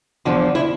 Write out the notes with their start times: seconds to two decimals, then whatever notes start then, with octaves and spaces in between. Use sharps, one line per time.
0.25 E2 D3 F3
0.55 E4